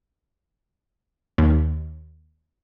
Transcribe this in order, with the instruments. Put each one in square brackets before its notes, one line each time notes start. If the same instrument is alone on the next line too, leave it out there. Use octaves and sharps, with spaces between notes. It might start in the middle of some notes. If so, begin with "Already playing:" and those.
[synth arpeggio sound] D#2